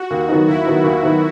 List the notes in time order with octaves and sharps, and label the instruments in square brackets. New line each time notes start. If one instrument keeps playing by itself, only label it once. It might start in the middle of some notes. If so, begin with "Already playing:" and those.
Already playing: [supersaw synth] F#4
[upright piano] D#2
D#3 F#3 B3 D#4
[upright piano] D#2 [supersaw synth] E4
[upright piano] D#3 F#3 B3 D#4
D#2
D#3 F#3 B3 D#4